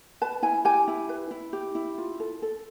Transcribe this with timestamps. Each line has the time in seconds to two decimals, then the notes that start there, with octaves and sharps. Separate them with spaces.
0.21 B4 A5
0.42 E4 G#5
0.65 G4 G#5
0.88 E4
1.09 B4
1.31 E4
1.53 G4
1.75 E4
1.98 F4
2.20 A4
2.42 A4